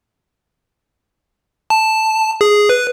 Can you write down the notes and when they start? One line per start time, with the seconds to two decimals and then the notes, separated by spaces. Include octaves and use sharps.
1.70 A5
2.41 G#4
2.69 B4